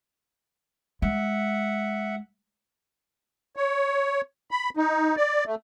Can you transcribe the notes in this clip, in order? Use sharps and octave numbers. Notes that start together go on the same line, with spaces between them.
G#3 E5 F#5
C#5
B5
D#4
D5
A3